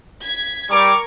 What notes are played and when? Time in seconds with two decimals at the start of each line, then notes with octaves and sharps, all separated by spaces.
0.22 G#6 B6
0.71 G3 A#4 C#6 D6 G#6